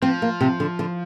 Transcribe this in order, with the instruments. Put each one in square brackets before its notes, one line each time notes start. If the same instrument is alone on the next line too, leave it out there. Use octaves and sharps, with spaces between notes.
[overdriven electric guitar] F3 [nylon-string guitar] C4
[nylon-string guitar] A#3
C3
D3
D3